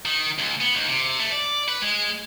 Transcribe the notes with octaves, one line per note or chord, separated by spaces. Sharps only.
D#3
C#2
B3
D#2
C3
A3
D5
B4
G#3